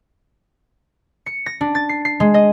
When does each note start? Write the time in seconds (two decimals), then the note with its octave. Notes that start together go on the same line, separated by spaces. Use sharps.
1.26 C#7
1.46 A#6
1.61 D4
1.75 A6
1.89 C7
2.05 C7
2.20 G#3
2.34 D#5